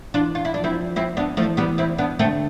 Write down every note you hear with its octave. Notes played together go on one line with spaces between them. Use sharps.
E3 D4 F4
F4
E4
F3 D4
C4 E4
C4 E4
B3 D4
E3 F3 A3
G3 B3
C4 E4
B3 D4
D3 A3 C4